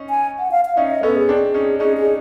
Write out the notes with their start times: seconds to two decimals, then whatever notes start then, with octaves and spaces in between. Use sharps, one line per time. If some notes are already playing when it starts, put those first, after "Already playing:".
Already playing: C#4 D#4
0.10 G#5
0.39 F#5
0.51 F5
0.65 F5
0.77 C#4 D#4 E5
0.91 D#5
1.03 B3 C#4 A4
1.16 G#4
1.29 C4 D4
1.54 C#4 D#4
1.80 C#4 D#4 G#4
1.97 G#4
2.05 D#4